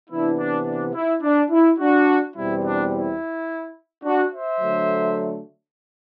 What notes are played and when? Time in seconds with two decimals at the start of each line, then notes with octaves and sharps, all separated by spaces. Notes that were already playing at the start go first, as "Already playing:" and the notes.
0.10 C3 E3 B3 D4 E4
0.38 D4
0.66 D4
0.95 E4
1.23 D4
1.51 E4
1.79 D4 F#4
2.35 E2 B2 G3 C4 E4
2.64 D4
2.92 E4
4.04 D4 F#4
4.32 C5 E5
4.61 D3 F#3 A3